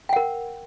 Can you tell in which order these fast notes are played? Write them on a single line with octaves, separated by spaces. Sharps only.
G5 F#5 A#4